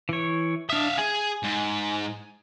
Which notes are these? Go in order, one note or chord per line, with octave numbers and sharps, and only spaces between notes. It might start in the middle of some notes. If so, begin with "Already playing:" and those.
E3 C#5
D4 E5 F5 D#6
G#4 G#5
G#2